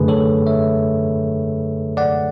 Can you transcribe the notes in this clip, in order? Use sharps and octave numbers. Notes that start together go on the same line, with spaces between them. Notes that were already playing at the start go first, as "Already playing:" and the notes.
Already playing: F#2 D3 A3 G#4 B4
A4 C#5
C#5 E5
D5 F#5